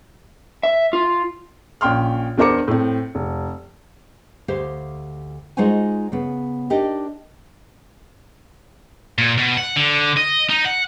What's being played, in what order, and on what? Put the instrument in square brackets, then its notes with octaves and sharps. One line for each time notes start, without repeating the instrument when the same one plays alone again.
[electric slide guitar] E5
F4
[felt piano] A#1 C#4 G5 C6 F6
E2 D4 A#4 C5 D6 C#7
A2 C4
F1
[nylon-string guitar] D2 G4 C5 F5
G#3 D#4 F4 F#4 C5 G#5
C#3 B3
D4 D#4 G4 A#4 D#5
[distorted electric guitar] A#2
B2
F#5
D3
D#5
D#4
F#5